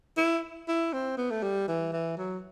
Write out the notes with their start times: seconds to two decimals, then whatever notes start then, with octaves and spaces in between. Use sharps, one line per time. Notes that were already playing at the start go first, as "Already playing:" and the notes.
0.17 E4
0.68 E4
0.93 C4
1.17 B3
1.31 A3
1.43 G3
1.68 E3
1.93 E3
2.18 F#3